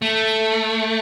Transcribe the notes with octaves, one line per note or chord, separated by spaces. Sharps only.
A3